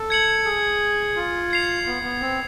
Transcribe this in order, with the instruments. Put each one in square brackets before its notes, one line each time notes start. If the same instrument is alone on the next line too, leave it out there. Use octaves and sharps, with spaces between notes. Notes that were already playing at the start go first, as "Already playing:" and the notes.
Already playing: [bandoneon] A4
[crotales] G#6 C#7 F#7
[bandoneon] G#4
F4
[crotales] G#6 C7 F7
[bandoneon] B3
B3
C4